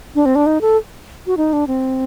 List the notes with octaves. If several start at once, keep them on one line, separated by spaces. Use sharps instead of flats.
D4
C4
D4
D#4
A4
F#4
D#4
D4
C4